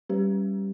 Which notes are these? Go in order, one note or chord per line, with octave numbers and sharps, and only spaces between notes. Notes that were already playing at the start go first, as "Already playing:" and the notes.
G3 C#4 G4 B4